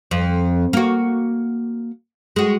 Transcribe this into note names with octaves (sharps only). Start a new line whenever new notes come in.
F2
A#3 F#4
G#3 F#4